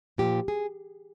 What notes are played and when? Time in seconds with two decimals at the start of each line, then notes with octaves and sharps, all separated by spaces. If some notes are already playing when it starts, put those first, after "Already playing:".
0.18 A#2 F3 G4
0.48 G#4